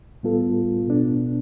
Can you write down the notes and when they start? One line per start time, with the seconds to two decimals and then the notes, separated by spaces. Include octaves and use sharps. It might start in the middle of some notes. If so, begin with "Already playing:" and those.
0.23 A2 G3 B3 F4 A4
0.87 B2 B3 D4